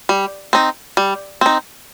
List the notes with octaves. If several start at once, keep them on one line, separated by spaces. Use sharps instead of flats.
G3
C4 D#4
G3
C4 D#4